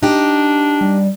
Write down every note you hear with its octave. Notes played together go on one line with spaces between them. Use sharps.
D4 D#4 G4
G3